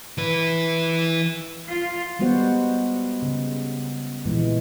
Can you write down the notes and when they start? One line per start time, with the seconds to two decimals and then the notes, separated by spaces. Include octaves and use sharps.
0.18 E3 B4
1.69 F4
2.19 G3 G#3 B3 F#4 C5 F#5
3.22 C#3
4.26 A#2 E3 G#3